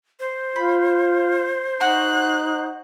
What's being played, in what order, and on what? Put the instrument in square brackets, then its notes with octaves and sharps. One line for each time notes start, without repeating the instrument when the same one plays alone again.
[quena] C5
[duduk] F4 [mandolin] B5
[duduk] D#4 [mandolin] F#4 [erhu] F#6